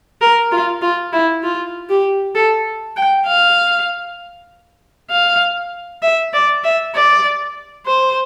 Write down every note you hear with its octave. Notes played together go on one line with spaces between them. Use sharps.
A#4
F4
F4
E4
F4
G4
A4
G5
F5
F5
E5
D5
E5
D5
C5